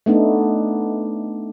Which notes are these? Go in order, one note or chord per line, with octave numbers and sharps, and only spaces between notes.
A3 B3 D4 D#4